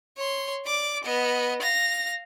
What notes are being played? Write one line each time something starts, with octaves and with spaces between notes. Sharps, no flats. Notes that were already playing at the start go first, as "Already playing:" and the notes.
C#5 C6
D5 D6
B3 D#5
F5 A#6